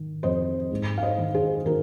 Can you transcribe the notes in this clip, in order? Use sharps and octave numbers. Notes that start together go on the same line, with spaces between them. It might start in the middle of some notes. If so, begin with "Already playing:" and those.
Already playing: D#3
F2 C5 D#5
G#2
F5
C5 D#5
D#3
G#4 C5
D#3 F#4 A#4